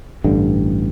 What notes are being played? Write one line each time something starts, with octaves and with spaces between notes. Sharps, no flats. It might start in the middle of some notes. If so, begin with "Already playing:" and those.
A1 G2 D3